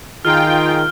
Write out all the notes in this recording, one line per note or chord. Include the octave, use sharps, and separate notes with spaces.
D#3 F4 G#4 G5 F6